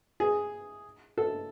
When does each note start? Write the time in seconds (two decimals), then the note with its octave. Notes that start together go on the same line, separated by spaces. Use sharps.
0.20 G#4
1.18 A4